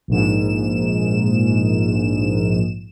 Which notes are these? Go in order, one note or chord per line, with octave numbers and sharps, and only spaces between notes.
A#1 G#2 E7